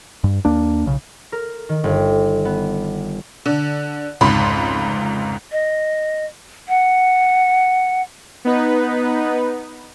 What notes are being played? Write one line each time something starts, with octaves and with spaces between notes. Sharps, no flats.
G2
D#2 A#3 D4
B1 C#3
A#4
D#3
G1
B3
D3
F1 C#2 G#2 B5 C6
D#5
F#5
B3 D#4 B4